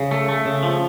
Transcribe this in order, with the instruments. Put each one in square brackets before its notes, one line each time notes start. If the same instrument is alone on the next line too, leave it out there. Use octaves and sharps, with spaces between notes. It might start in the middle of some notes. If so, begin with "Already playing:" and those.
Already playing: [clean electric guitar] C#3
A3
A3
C#3
F3